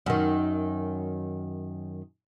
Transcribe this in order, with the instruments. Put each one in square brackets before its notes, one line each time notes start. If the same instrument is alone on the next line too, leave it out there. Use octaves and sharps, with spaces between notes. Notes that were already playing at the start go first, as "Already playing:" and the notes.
[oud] F#2 D#3